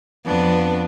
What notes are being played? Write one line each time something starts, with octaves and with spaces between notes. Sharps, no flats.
F2 B3 D4